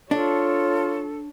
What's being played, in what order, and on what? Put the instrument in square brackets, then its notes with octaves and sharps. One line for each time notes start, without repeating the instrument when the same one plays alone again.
[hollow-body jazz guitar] D4 [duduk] F4 [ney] A4 [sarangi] C#5